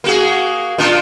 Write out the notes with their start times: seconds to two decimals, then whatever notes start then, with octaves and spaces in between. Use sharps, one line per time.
0.04 A#3 F#4 G#4
0.78 A#2 D4 F4